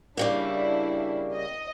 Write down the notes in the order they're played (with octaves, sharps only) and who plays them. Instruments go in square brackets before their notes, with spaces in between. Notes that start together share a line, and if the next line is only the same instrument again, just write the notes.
[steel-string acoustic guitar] C#3 G3 A#3 [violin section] D4 E4
[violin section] D#5